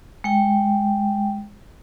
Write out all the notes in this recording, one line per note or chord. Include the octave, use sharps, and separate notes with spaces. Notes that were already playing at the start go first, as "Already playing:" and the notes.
G#3 G5